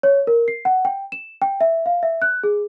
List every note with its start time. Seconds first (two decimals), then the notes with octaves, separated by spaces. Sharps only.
0.03 C#5
0.27 A#4
0.48 C7
0.65 F#5
0.85 G5
1.12 E7
1.42 G5
1.61 E5
1.86 F5
2.03 E5
2.22 F#6
2.43 G#4